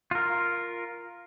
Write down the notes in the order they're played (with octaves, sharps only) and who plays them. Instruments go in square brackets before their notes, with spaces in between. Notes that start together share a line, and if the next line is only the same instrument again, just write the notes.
[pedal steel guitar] F4 A#4